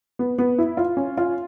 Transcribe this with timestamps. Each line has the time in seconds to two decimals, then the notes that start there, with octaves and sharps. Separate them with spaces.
0.19 B3
0.38 B3
0.58 E4
0.77 F4
0.97 C#4
1.17 F4